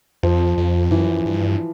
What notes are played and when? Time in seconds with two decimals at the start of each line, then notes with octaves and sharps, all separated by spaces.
0.23 F2 F3
0.57 F2
0.90 F#2 E3
1.25 G2